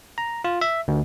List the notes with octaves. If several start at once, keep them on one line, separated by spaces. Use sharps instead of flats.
A#5
F4
E5
D2